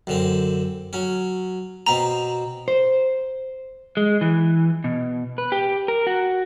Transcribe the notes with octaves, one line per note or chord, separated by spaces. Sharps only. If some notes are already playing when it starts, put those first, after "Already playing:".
F#2 D3 C4
F#3 C#4
B2 C4 A#5 B5
C5
G#3
E3
B2
B4
G4
A#4
F#4